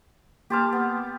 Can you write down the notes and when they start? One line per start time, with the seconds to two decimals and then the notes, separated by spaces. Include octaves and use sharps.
0.50 A#3 G4 A5 C6 D6 F6
0.72 B3